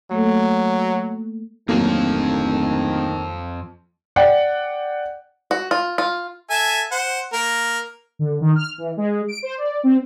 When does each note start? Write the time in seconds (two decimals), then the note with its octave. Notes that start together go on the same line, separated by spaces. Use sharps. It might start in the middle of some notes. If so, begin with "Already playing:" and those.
0.11 F#3 A3 A#3 A4
1.69 D1 F2 D#3 F3 F#3 A#3
4.16 D5 F#5 G5
5.51 F#4
5.71 F4
5.98 F4
6.50 A4 E5 G#5
6.92 C5 F#5
7.33 A#3 A#4
8.19 D3
8.41 D#3
8.55 F6
8.78 E3
8.97 G#3
9.28 D7
9.43 C5
9.58 D5
9.83 C4